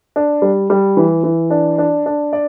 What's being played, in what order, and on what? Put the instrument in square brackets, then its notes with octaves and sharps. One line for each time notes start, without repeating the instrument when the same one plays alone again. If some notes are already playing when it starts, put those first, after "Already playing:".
[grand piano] D4
G3
G3
E3
E3
D4
D4
D4
D5